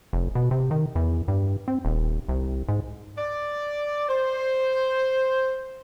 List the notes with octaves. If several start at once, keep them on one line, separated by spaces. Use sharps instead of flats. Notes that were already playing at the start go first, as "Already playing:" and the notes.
F1
B2
C3
D#3
E2
G2
C4
D#1
C2
G#2
D5
C5